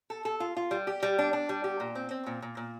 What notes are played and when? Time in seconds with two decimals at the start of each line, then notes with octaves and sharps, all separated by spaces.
0.10 A4
0.25 A4
0.40 F4
0.57 F4
0.71 G3
0.87 G4
1.03 G3
1.18 D4
1.33 D4
1.49 G3
1.64 G4
1.80 A#2
1.95 C4
2.11 C4
2.26 A#2
2.42 A#2
2.57 A#2